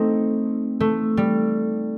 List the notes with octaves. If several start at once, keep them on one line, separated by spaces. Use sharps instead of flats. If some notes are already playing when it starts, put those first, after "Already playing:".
Already playing: A3 C4 D#4
A3
G3